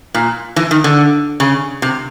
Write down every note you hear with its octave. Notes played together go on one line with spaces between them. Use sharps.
A#2
E3
D#3
D3
C#3
C3